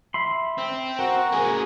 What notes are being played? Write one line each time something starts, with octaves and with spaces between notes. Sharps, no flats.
E5 B5 C6
C4
F#4 A#4 F#5
A#3 G#4